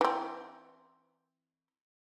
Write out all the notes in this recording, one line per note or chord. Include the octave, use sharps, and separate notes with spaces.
E3 C4